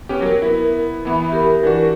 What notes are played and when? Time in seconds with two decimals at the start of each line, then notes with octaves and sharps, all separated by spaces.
0.09 B3 C#4 G4
0.21 F#3 G4 A#4
0.42 B3 E4
1.05 E3 B3 E5 B5
1.32 G4 A#4
1.63 E3 D4 F#4